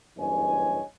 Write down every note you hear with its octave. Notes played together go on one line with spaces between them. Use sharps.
F#1 E2 G2 C#5 D#5 G#5